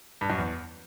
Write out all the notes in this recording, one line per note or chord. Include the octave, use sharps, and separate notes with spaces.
G2
F#2
E2